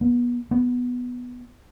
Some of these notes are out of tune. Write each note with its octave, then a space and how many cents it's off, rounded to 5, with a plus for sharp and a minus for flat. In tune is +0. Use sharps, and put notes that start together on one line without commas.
B3 -30
B3 +0